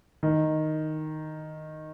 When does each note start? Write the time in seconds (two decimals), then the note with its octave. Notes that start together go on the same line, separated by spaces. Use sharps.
0.23 D#3